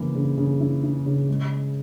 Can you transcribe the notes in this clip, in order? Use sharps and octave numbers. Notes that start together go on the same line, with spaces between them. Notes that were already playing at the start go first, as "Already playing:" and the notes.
Already playing: C#3 E3 A#3
C#3
C#3
E4
E4
C#3
G#3